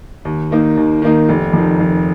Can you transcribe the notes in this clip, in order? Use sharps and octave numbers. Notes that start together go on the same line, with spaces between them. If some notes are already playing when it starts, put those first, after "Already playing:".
D#2
D#3 A#3 D#4
D#2
D#3 A#3 D#4
F1
F2 D#3
F1